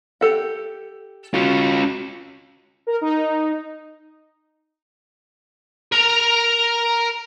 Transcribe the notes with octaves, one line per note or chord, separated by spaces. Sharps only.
G4 A4 F#5
C#4 F4 F#4
A#4
D#4
A#4 A#5